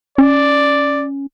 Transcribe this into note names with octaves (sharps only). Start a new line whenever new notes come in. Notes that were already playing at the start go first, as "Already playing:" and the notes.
C#4 D5